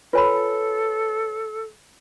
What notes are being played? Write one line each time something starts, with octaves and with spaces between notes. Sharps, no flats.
F4 A4 B4 C#5 G#5 B5